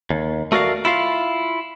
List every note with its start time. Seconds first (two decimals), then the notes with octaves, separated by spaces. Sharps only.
0.10 D#2
0.52 A3 F#4 A#4 D5 F5
0.85 E4 F4 F5